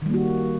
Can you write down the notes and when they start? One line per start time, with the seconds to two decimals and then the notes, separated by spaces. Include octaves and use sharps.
0.02 D#3
0.06 G3
0.10 A#3
0.14 F#4